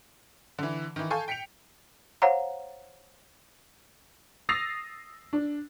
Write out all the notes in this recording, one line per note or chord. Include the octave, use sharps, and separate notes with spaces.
D3 E3
D#3 E3
A4 F5 G#5 C#6 G6
G5 B6 C#7 D7 F7
C5 C#5 F5 F#5 A#5
D#6 E6 A6 A#6 C7 F7
D4